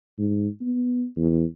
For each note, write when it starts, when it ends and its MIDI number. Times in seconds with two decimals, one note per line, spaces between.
0.19 0.48 44
0.61 1.06 59
1.17 1.44 40